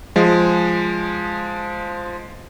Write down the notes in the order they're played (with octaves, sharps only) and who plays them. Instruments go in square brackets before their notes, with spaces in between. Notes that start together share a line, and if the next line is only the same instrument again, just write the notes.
[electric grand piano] F3 G#3